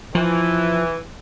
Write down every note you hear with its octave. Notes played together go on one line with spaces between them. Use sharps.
E3 F3